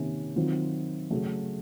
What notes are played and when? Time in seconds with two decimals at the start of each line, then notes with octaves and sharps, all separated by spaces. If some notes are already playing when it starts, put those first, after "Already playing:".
Already playing: C3 D#3 A#3 C#4
0.36 D#3 F#3 C4 F4
1.11 C#3 F#3 A3